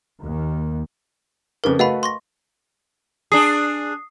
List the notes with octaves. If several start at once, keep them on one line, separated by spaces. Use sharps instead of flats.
D#2
F2 C#3 A#4 B4 D6
A3 F#4 B4 D#5 F5 B5
C6 C#6 A#6
D4 G#4 D#6 C7